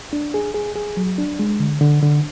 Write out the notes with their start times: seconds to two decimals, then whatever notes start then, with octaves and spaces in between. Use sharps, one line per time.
0.13 D4
0.34 G#4
0.54 G#4
0.76 G#4
0.97 F#3
1.18 D4
1.39 G#3
1.60 D3
1.81 D3
2.03 D3